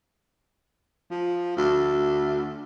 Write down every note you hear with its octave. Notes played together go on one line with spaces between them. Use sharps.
F3
D2